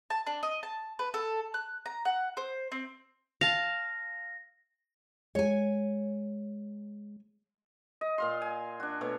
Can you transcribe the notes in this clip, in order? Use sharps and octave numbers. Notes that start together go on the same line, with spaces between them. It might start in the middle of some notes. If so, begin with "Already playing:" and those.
A5
D4
D#5
A5
B4
A4
F#6
A#5
F#5
C5
C4
F5 A5 A#6
G#3 C#5 G#5
D#5
A#2 F5 C6
G#5
D4 F#4
B2 A3 C#5